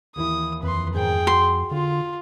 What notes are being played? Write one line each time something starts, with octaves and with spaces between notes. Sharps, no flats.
D#2 E3 E4 D#6
F2 B4 C6
E2 G#2 D#3 G#4 G5
F#4 C6
D3 F4